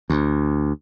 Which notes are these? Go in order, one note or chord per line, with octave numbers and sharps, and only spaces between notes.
D2